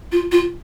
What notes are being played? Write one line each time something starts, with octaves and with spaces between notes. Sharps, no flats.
F4
F4